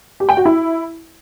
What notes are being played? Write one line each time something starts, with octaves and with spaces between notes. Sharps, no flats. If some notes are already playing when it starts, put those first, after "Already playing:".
G4
G5
F#4
E4